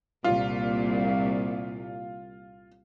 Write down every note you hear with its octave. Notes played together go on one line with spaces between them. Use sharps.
C2 A#2 F4